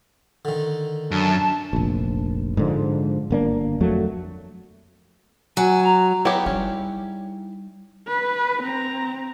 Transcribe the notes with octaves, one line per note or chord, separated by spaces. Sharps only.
D3 D#3
F#2 D4 A5
F1 A#1
G#2 D3 F3
G1 A#3 D4
F2 F#3 A3
F#3 G#5
A#5
F#3 B3 E4 G4 G#4 D5 G5
G3 C#4 D#4
B4
C4 A#5